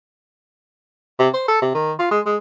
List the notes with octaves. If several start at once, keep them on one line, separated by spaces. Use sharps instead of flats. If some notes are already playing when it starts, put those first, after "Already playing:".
C3
C5
A4
C3
D#3
F4
G#3
G#3